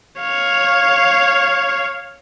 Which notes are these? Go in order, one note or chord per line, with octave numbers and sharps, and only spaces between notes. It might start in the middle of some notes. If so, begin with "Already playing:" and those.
C#5 F5